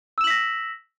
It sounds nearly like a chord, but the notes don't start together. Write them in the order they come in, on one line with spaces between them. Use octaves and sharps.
E6 E7 F#7 B6 A#6